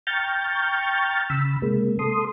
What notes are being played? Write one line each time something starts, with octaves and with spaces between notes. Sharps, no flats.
G5 A#5 C#6 F6 G6 A6
C#3 B5 E6
C3 G#3 A#3
A4 C6 D#6